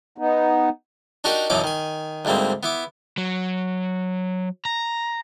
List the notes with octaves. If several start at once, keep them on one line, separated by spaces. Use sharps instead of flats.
B3 D#4
D4 D#4 F#4 G4 A#4 D#5
F#2 B2 E3 C#4 D#4 D6
D#3 G#5
D2 G#2 G3 A#3 C4
B3 E4 D6
F#3
A#5